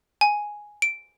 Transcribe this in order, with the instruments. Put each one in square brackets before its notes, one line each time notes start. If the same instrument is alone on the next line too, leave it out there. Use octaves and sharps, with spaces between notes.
[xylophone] G#5
D7